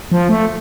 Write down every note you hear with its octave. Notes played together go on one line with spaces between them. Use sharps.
F3
A3